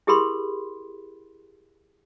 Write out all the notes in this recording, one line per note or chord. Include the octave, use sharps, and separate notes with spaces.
E4 G4 G#4 A#4 B5 C6